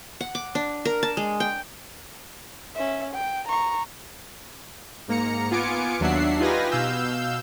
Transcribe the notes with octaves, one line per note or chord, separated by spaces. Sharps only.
F#5
D6
D4
A#4
A5
G#3
G5
C#4 E5
G5
A#5 C#6
G#2 A#3 A#5 C#7
B3 F4 G#5 D6 C#7 D7
D#2 F#3 D4 E5 F#5 C7
D#4 F4 G4 B4 G#5 A#6
B2 F5 E6 G6